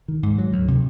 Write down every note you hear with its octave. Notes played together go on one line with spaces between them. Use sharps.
D#3
G#2
F#3
D2
C3